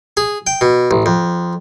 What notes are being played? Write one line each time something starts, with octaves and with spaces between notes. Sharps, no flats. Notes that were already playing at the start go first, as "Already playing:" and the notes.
G#4
G5
B2
A1
F2